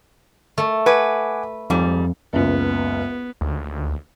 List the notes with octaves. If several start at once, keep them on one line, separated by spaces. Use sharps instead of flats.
A3
B4 F#5 G#5 D6
F2 G#2 G3
F#1 C#2 B3
D2